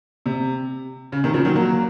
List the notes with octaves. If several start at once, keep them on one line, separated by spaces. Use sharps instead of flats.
C3
C#3
C3 D#3
C#3 F3
D#3 F#3
F#3 A#3